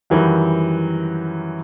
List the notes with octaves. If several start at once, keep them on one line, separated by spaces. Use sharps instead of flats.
F#2 D#3 E3 F#3 G3